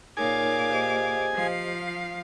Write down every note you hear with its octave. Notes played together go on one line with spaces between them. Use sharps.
A#2 D#4 G#4 A#4 C#5 F5 G#5 D6
G4 C5 D#5
F3 F5